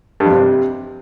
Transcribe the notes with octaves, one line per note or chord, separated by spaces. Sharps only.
G2
F2
C3